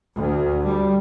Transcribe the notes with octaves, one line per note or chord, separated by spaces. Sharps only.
D2
G3